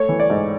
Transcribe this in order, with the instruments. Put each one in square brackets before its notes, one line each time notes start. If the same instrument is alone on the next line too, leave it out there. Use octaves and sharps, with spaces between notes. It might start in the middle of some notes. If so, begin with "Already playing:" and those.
Already playing: [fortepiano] A3 C#5
E3
D5
G#2